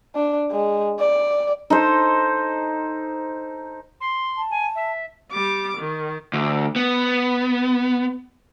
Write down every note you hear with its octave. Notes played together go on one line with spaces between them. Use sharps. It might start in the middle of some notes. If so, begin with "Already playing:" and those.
D4
G#3
D5
D#4 A4 C5
C6
A5
G#5
E5
G3 D6
D#3
D2
B3